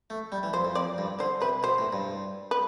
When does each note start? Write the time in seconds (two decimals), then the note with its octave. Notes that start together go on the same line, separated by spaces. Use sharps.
0.10 A3
0.32 G3
0.43 E3
0.53 F2 C5
0.65 F2
0.75 F2 D5
0.98 G2
1.19 D3 C5
1.41 C3 B4
1.63 B2 C5
1.78 A2
1.93 G2
2.51 B4